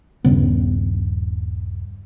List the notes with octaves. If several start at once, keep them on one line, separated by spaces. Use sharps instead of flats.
D#1 G2 C#3 B3